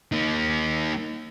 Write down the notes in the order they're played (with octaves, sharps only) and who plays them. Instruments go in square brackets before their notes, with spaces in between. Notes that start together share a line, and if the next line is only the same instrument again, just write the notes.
[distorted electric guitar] A#3 D#4